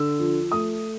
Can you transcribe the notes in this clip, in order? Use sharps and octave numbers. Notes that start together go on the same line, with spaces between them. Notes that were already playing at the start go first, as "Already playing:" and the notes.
Already playing: D3 E6
F3
A3 D#6